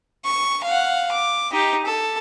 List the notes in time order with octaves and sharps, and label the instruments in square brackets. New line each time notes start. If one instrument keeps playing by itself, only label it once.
[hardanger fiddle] C#6
F5 F#5
D6
D#4 G4
A4